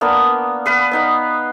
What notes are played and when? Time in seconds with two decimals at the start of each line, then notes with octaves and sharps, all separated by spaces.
0.01 A#3 B3 D4 A#4
0.66 B3 B4 F5
0.91 B3 D#4 F5